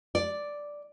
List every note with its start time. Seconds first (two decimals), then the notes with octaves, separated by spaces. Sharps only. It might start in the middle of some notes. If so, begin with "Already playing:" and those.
0.15 D5